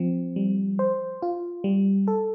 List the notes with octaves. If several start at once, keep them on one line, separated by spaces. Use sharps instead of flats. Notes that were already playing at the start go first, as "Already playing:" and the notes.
Already playing: F3 C4
G3
C5
F4
G3
A4